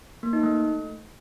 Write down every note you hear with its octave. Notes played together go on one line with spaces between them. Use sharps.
A#3
D#4
A3